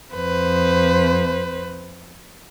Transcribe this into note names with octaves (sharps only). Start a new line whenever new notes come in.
F2 B4 C5